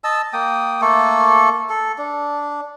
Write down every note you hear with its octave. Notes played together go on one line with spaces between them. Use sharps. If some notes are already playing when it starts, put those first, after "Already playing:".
D#5 A5 E6
A#3 G5 D#6
A3 A#3 A4
A4
D4